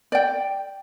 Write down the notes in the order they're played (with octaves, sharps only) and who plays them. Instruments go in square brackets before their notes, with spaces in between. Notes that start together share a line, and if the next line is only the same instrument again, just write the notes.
[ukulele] D5 G5